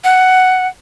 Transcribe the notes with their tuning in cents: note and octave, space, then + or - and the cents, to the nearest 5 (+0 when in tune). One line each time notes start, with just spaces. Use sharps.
F#5 +5